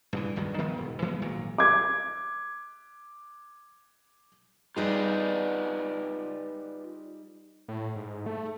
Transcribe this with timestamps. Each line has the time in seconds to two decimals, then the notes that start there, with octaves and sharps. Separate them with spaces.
0.13 G2 C#3 E3
0.36 C#2 G2 D#3 F#3
0.58 D#3 F3 B3
0.77 E1 G#2
1.02 E3 G#3 A#3 B3
1.22 G#1 A#2 F#3
1.58 D6 G#6
4.76 G3 D#4 F4 G#4 B4 D5
7.68 A2
7.96 G#2
8.26 A3